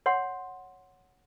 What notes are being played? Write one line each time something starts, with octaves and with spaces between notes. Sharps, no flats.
C#5 F#5 C6